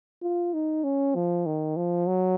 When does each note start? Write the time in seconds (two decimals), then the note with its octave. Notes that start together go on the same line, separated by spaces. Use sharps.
0.22 F4
0.54 D#4
0.84 C#4
1.15 F3
1.46 D#3
1.77 F3
2.07 F#3